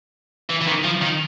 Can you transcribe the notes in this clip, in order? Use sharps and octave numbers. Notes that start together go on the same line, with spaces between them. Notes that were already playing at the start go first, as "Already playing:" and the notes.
E3
E3
D#3
F3
D#3